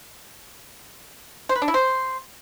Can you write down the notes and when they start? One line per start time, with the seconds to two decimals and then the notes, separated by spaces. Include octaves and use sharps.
1.49 C5
1.56 B4
1.62 D4
1.68 E4
1.74 C5